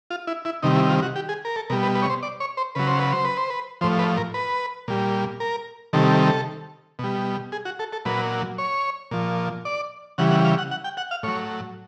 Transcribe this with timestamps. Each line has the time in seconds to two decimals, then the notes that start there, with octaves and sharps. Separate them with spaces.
0.10 F4
0.27 E4
0.45 E4
0.63 C3 D#3 G3 D#4
0.76 E4
0.90 F4
1.02 F#4
1.16 G4
1.29 G#4
1.45 A#4
1.56 A4
1.70 B2 G3 A#4
1.83 B4
1.95 B4
2.02 C#5
2.10 C5
2.23 D5
2.40 C#5
2.57 C5
2.75 C#3 F#3 B4
2.87 C5
2.99 B4
3.12 C5
3.25 B4
3.37 C5
3.50 B4
3.81 A2 F3 C5
3.99 B4
4.17 A#4
4.34 B4
4.88 A#2 G3
5.40 A#4
5.93 C3 D#3 G3 A4
6.99 B2 G3
7.52 G#4
7.65 F#4
7.79 A4
7.93 A4
8.05 A#2 F#3 B4
8.58 C#5
9.11 A#2 F3
9.65 D5
10.18 C#3 E3 G3 F#5
10.31 F#5
10.45 F5
10.58 F#5
10.71 F#5
10.84 G5
10.97 F#5
11.11 F5
11.23 A2 F#3 C#5